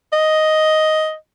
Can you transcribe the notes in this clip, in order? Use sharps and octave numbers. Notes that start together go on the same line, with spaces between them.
D#5